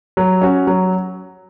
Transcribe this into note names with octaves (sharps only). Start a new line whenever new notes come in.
F#3
C#4 F#4
F#3